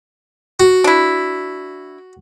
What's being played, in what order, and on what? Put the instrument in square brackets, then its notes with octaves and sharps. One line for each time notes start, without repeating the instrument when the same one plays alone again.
[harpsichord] F#4
[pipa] D4 E4